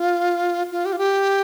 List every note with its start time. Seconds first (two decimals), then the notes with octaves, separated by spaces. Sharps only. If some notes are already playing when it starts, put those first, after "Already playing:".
Already playing: F4
0.71 F4
0.85 G4
0.93 F4
0.98 G4